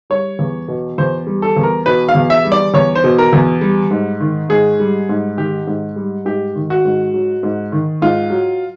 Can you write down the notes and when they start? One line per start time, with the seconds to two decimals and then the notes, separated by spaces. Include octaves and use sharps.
0.10 G3 C#5
0.39 E2
0.68 B2
0.98 E2 C5
1.27 G3
1.42 A4
1.56 E2
1.63 A#4
1.86 B2 B4
2.09 F5
2.15 E2
2.30 E5
2.45 G3
2.52 D5
2.74 E2 C#5
2.95 C5
3.04 B2
3.18 A#4
3.33 E2
3.61 G3
3.91 G#2
4.20 D#3
4.49 G#2 G#4
4.80 G3
5.09 G#2
5.37 D#3 G4
5.67 G#2
5.96 G3
6.25 G#2 G4
6.56 D#3
6.70 F#4
6.85 G#2
7.14 F#3
7.43 G#2
7.72 D#3
8.02 G#2 F4
8.30 F#3